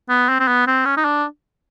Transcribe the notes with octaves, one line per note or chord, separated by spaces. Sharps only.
B3
C4
C4
B3
C4
C#4
D#4
D4